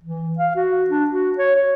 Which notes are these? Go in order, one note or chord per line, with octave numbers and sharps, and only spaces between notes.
E3
F5
F#4
D4
F#4
C#5
C#5